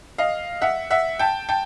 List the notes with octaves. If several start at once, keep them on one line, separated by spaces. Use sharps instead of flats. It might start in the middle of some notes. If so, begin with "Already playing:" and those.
D#5 F5
E5 F#5
E5 F#5
G5 A5
G5 A5